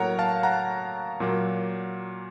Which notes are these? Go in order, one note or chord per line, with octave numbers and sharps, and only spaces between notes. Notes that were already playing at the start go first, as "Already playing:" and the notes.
Already playing: A2 F#3 A#3 A#4 C#5 F#5 A#5
F5 A5
F#5 A#5
A#2 F#3 A#3